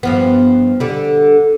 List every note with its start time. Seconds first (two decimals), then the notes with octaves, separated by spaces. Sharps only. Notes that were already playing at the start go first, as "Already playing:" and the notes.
0.03 G2 F3 B3
0.80 D3 G3